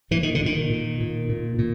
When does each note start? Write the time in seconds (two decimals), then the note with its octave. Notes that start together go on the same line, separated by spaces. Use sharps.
0.11 A#2 E3
0.23 D#3
0.35 D3
0.41 A#2 D#3
0.70 A#2
1.01 A#2
1.29 A#2
1.59 A#2